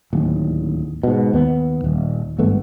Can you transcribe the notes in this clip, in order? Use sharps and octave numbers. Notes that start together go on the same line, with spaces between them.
D1 D#2
G#2 B2
D#2 B3
D#1
G#1 G2 A3 B3